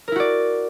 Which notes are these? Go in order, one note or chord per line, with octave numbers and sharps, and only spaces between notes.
E4 F#4 A#4 D5